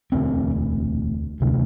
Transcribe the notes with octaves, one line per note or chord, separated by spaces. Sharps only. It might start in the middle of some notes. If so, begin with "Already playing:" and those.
E1 D2 D3 C4
E1 D2 C3